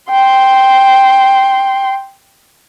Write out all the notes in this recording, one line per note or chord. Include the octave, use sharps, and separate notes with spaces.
G5 C6